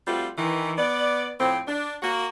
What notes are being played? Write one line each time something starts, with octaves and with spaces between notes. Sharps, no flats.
G3 A3 C4 F4 F#4
D#3 E3
B3 D5
A2 F3 C4
D4
A#3 F#4